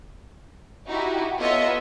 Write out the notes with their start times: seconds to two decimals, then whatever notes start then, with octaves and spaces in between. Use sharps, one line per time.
0.87 D#4 E4 F#4 G4
1.37 B3 F4 A4 C#5 D#5 E5